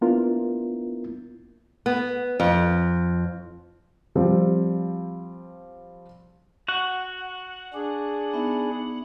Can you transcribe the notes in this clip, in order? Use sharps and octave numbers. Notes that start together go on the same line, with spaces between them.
A#3 B3 D4 E4 F4 A#4
B3
F2
F3 G3 C4
F#4 F#5
D4 G#4 D6
B3 D#4 E5